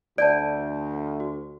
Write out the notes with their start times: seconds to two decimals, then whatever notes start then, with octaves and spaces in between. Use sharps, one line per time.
0.18 D2 D5 A5 G6 D7
1.20 F#4